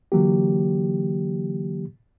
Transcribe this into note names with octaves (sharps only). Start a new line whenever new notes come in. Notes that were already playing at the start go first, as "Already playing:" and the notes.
D3 E3 F#3 A#3 G4